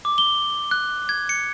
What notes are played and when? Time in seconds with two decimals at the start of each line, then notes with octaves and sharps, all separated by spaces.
0.05 D6
0.18 G7
0.71 F#6
1.09 G#6
1.29 C#7